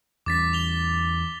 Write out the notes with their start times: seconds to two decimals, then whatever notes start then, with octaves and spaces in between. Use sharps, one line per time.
0.26 E2 C#4 D6 A6 B6
0.53 F7 G7